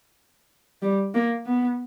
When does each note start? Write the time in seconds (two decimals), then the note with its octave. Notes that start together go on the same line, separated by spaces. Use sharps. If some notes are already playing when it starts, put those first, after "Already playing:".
0.82 G3
1.15 A#3
1.46 B3